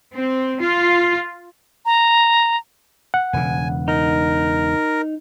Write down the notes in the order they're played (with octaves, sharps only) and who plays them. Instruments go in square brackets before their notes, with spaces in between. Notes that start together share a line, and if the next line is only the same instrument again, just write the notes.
[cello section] C4
F4
[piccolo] A#5
[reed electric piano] F#5
[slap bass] E1 C#3 [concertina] G#5
[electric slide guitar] D#4 [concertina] A#4